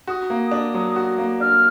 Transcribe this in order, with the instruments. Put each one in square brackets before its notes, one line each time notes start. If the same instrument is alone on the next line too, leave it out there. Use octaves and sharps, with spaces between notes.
[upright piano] F#4 [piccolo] D#6
[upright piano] A#3
D4
F#3
F#4
A#3
[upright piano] D4 [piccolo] F6